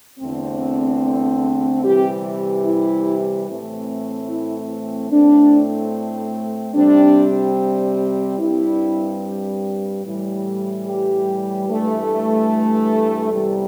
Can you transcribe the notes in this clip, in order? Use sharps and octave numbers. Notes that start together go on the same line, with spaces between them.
E2 D3 A3 C4
C3 E3 G3 G4
E4
A2 E3 A3 C4
E4
A2 A3 C4 D4
C3 G3 C4 D4
G2 G3 C4 E4
A2 E3 G3
G4
G2 E3 A3
E2 C3 G3